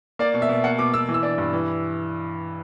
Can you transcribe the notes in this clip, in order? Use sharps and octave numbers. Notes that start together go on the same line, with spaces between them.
A#3 D5
B2
E5
B2
A#3 F#5
B2 D6
B2 E6
E3
E6
D4
G2
E3